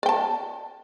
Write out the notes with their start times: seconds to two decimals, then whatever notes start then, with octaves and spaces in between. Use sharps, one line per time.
0.03 D5
0.06 G5
0.09 A5